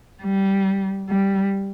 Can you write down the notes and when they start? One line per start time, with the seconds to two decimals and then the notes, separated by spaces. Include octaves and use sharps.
0.23 G3
1.09 G3